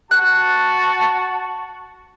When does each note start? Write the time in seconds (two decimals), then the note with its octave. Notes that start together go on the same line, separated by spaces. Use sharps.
0.11 F#4 A5 F#6